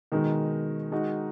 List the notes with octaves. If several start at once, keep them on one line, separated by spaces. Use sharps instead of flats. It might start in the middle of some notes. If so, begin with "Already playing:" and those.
B2 D#3 G#3 D#4
G#3 D#4 F#4